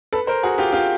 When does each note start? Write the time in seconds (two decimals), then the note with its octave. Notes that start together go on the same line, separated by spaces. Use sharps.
0.13 A4 B4
0.27 A#4 C5
0.43 F#4 G#4
0.58 F4 G4
0.72 F4 G4